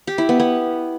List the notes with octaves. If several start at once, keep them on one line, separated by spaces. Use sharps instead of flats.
G4
E4
B3
B3